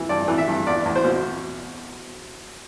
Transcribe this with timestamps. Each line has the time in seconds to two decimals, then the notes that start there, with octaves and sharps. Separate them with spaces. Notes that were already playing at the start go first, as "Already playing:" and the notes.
Already playing: E3
0.09 G2 D5
0.28 E3
0.38 E5
0.47 G2
0.66 E2 D5
0.85 E2
0.95 C5
1.05 B2